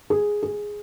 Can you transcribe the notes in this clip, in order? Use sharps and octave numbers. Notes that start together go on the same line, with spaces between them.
G#4
G#4